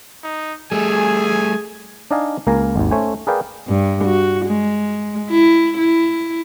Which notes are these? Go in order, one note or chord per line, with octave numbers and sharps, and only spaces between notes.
D#4
G3 A3 G#4 G#5
D4 D#4 D5 D#5 F5 G#5
C#2 A#3 A#4 F5 G#5 A#5
G#1 D#2
A3 C#4 C5 G#5
G#4 A#4 B4 D5 F5 G5
G2
F#4
G#3
E4
E4